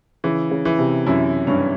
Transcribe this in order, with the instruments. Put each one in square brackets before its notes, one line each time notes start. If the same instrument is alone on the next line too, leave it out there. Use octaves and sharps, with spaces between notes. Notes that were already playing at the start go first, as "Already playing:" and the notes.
[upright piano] C#3 [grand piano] E3
[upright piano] C#3
[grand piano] E3
[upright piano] C3
[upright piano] F#2 [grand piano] E4
[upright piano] G2 [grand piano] C#4